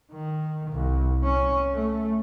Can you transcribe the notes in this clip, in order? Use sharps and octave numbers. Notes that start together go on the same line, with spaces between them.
D#3
C2
C#4
A3